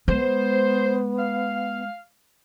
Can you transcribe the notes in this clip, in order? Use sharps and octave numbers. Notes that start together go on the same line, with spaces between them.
G#3 B3 C5
F5